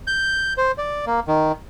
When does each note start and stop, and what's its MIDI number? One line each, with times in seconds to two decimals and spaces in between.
0.07 0.54 91
0.57 0.72 72
0.78 1.05 74
1.07 1.20 58
1.28 1.52 51